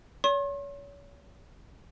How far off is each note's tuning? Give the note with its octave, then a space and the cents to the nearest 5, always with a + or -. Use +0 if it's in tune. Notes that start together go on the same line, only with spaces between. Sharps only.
C#5 +35 C6 +45